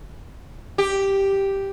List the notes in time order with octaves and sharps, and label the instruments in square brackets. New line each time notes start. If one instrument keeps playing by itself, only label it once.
[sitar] G4